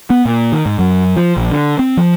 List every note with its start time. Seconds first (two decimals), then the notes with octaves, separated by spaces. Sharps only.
0.10 B3
0.25 A#2
0.52 D#3
0.66 G#2
0.79 F#2
1.16 F3
1.37 A#1
1.51 D3
1.79 C4
1.97 F3